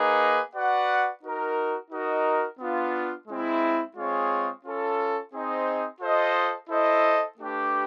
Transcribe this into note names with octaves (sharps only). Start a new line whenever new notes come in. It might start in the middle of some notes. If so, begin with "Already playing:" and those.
Already playing: A#3 D#4 G#4 B4 D#5
F#4 B4 D5 F#5
D#4 F#4 A#4
D#4 F#4 A#4 D#5
B3 D4 F4
G#3 C4 E4
G#3 C4 F4 G#4 C#5
C#4 F4 A4
C4 D#4 G#4 C5 D#5
F4 A4 C5 D#5
E4 A4 C5 D#5
A3 D4 G4 B4